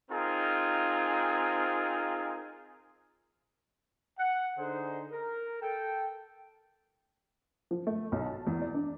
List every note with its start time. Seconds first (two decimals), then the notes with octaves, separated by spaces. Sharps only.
0.11 C4 D#4 F4 G#4 A#4
4.18 F#5
4.58 D3 D#4 G#4 C5
5.11 A#4
5.62 A4 G5
7.71 F3
7.87 A3
8.12 B1
8.26 A5
8.47 E2
8.62 D5
8.74 D4